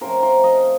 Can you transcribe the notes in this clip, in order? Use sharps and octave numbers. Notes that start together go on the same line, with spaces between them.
C3 F3 A3 C#4 A#4 C5
A#4 C5
D#5 F5